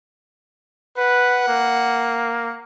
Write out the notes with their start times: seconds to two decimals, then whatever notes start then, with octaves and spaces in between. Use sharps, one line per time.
0.97 B4 F#5
1.48 A#3